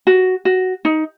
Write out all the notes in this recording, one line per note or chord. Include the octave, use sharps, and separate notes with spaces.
F#4
F#4
D#4